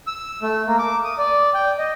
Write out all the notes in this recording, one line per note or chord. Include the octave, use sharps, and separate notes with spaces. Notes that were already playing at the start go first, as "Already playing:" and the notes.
E6
A3
A#3
D6
D#6
D5
G5
D#5